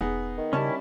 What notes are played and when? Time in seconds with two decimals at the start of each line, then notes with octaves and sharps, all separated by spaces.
0.01 E1 B3 D#4 G#4
0.38 D#3
0.53 C#3 G3 C#4 E4 A5 C#6